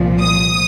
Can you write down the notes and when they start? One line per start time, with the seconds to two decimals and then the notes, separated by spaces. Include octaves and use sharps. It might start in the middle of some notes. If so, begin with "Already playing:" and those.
Already playing: C2 A#2 F3
0.21 D#6